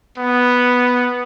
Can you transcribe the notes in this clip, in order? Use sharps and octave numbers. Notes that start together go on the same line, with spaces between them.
B3